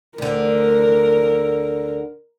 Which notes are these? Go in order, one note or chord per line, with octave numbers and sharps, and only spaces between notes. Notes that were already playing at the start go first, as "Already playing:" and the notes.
D2 D3 A#4